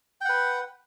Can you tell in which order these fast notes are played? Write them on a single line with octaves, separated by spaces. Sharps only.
G5 F#5 B4